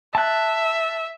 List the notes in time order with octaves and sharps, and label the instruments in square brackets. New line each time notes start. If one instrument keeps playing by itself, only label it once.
[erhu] E5 [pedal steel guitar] A5 F#6